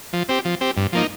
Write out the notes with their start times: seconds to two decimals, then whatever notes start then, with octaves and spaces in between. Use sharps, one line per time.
0.13 F3
0.29 C4 G4
0.45 F3
0.61 C4 G4
0.77 G2
0.92 F3 A#3 D#4